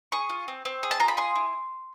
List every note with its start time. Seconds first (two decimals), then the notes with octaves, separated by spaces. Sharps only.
0.12 G#4 C#6
0.29 F4
0.48 C4
0.65 C4
0.83 G#4
0.91 A5
1.00 F4 A#5
1.08 B5
1.17 G#4 C6
1.35 E4